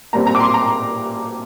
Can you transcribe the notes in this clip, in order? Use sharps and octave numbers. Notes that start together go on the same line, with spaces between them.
A#2 G3 C4 A#5
A#5
D6
C6
A#5